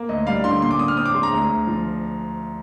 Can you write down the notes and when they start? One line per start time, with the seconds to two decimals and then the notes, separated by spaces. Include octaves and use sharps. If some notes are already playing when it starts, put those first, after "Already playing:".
Already playing: A#3
0.09 D2 D#5
0.27 G3 F5
0.44 D3 C6
0.62 A#2 C6
0.71 D6
0.79 A#2 D#6
0.88 F6
0.97 C4 D#6
1.06 D6
1.14 G#3 C6
1.23 A#5
1.33 D2
1.49 D2
1.67 F3